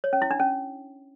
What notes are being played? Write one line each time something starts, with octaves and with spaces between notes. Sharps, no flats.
C#5
C#4
E4
D4
C#4